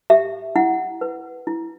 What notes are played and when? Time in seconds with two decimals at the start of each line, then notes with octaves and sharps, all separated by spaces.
0.10 G4 E5
0.56 E4 F#5
1.01 B4
1.47 E4